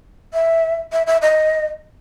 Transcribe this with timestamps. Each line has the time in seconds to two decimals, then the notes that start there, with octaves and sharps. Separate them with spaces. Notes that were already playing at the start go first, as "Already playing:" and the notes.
0.33 E5
0.92 E5
1.07 E5
1.22 D#5